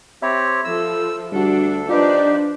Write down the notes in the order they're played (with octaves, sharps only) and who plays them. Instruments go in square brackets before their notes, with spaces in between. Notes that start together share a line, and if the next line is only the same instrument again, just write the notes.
[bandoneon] C4 G4 C#5 [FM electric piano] E5 B5
[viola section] F3 A4 [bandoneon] E6
[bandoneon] D2 A4 [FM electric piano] G3 F#4 [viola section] D4
[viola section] F3 D4 [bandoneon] D#4 G4 [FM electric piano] F4 B4 [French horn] D5